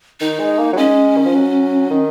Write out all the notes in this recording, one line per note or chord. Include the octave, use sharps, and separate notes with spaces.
D#3 D#4
G#3
A#3
F#3
G#3 C#4
D#3
F3
F#3
D#3